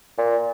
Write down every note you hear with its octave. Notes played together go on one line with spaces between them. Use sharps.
A#2